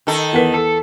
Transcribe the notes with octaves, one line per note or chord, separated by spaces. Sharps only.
D#3 A4
E2 B3 A#4 B4 F#5 B6
A4